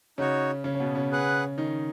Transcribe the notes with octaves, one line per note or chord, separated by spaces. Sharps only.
C#3 C#4 D#4 F#4 C#5
C#3 C#4
C#4
B2 B3
C#3 C#4
G#4 B4 F#5
D#3 D#4